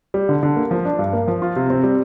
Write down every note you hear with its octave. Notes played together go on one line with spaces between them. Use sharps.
G3
D3
D3
A#3
F3
D4
G2
A#3
F3
F4
C3
C4
G3